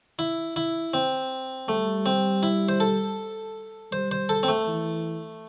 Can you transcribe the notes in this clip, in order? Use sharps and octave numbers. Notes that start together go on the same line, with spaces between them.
E4
E4
C4
G3 A3
C4
E4
C5
A4
G3 C5
C5
A4
C4
A3
E3